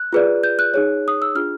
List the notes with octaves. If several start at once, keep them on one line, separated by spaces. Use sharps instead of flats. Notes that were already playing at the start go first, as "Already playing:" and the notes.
Already playing: F#6
F4 G#4 B4 D5
G6
F#6
D#4 G#4 C#5
D#6
E6
D4 F4 G#4 F6